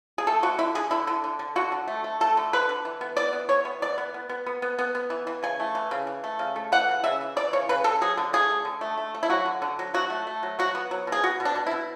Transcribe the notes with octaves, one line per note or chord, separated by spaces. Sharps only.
G#4
A3 A4
D3 F#4
D3 E4
D3 G#4
D3 E4
D3
D3
D3
D3 F#4
D3
A3
A3
A3 A4
D3
D3 B4
D3
E3
B3
E3 D5
B3
E3 C#5
B3
E3 D5
B3
B3
B3
B3
B3
B3
B3
E3
E3
C#3 G#5
A3
E3
C#3
E3
A3
C#3
A3
E3 F#5
C#3
C#3 E5
E3
E3 D5
C#3 C#5
C#3 B4
C#3 A4
F#3 G#4
D3
D3 G#4
A3
D3
A3
A3
A3
E4
F#3 F#4
D3
D3
F#3
F#3 F#4
A3
A3
F#3
F#3 F#4
B3
F#3
B2
G#4
B2 F#4
B2
D4
B2
E4
B2